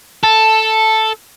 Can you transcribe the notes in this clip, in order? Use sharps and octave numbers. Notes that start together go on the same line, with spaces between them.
A4